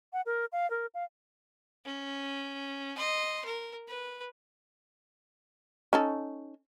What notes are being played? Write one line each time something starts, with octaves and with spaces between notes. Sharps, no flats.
F#5
A#4
F5
A#4
F5
C#4
D#5 C6
A#4
B4
C#4 D#4 A4